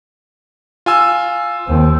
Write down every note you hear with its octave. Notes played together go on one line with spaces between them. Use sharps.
F4 G#5 E6
D#2 C4